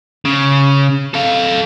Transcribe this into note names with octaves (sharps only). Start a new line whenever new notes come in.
C#3
A4 F5